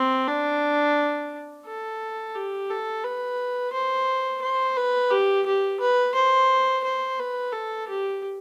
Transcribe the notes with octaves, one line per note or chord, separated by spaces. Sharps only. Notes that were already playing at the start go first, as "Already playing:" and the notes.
Already playing: C4
D4
A4
G4
A4
B4
C5
C5
B4
G4
G4
B4
C5
C5
B4
A4
G4